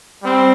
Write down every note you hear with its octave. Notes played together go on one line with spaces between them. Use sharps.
G3 C4